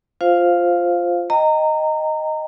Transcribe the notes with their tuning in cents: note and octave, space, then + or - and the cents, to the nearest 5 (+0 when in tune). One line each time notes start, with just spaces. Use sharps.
F4 +0 C5 +0 F5 +0
D#5 +0 G5 +0 A#5 -20